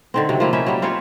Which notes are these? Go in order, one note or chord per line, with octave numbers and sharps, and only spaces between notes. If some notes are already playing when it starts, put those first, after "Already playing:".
D3 D#3 C4
C3 F#3
F3 A#3 E4
C#4 D#4 E4 E5
F#3 G3
C4 F4 C5 C#5